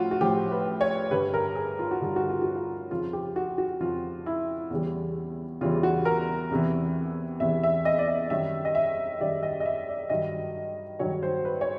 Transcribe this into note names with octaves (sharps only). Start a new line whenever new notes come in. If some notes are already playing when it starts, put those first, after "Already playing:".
Already playing: A2 F3 F4 F#4
F#4
A2 F3 G4
B4
C#5
G2 D3 G3 B4
A#4
G#4
F4
F#4
G2 D3 G3 F4
F#4
F4
F#4
F4
F2 C#3 F3 F4
G4
F#4
F#4
F2 C#3 F3 F4
E4
E2 C#3 E3 G3
E2 C#3 E3 G3 F4
F#4
A#4
E2 C3 E3
E2 C3 E3 E5
E5
D#5
D5
D#5
F#2 D#3 G3 E5
D#5
E5
F#2 D#3 G3 D5
D#5
D#5
E5
D5
G2 D#3 F#3 D#5
G2 D#3 F#3 C#5
C5
B4
C#5